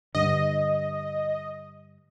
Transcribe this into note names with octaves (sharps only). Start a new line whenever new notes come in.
G2 D3 D#5